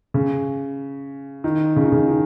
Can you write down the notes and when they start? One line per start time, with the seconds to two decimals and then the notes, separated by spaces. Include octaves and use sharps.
0.14 C#3
1.44 D#3
1.76 C#3
1.84 D#3
1.92 C#3
2.08 D#3